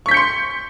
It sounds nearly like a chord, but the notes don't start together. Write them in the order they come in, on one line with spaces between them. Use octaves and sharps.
C#6 B6 G6 C#7 C6